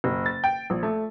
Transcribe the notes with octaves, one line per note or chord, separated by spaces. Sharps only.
F#1
A6
G5
A#1
A3